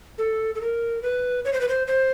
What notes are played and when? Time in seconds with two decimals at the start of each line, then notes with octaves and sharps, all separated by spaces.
0.18 A4
0.55 A4
0.61 A#4
1.02 B4
1.45 C#5
1.53 C5
1.61 B4
1.69 C5
1.87 C5